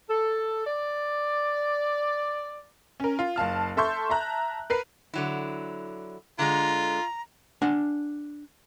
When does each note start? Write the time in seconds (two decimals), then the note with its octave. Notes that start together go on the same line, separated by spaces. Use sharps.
0.10 A4
0.67 D5
3.00 C#4 A#4
3.19 F4
3.36 F#1 F5 A5 F6
3.77 A4 E5 A5 C6 C#6 G6
4.09 E5 A5 A#5 F#6
4.70 A#4 B4 C7
5.14 D3 F#3 E4
6.39 D3 G#3 F4 A#5
7.62 D4 F#5 G#5